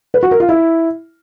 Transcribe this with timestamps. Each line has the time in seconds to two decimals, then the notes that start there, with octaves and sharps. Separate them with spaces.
0.14 B4
0.23 F#4
0.31 A#4
0.40 F4
0.49 E4